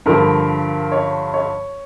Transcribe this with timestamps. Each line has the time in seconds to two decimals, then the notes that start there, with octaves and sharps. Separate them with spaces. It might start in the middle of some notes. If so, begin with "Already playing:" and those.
0.06 G2 D3 F3 A#4
0.92 C#5
1.34 C#5